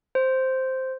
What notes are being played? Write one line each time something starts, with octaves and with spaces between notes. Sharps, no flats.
C5